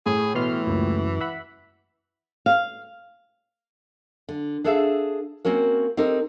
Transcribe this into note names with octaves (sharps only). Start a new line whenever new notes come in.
A2 G#4
B2 E3 C6 F6
C#2 F#2 A#2
E5 F#5 B5
F5
D3
D4 G#4 A4 C5 E5 F5
A#3 C4 C#4 F#4 A#4
C4 D#4 G4 A4 A#4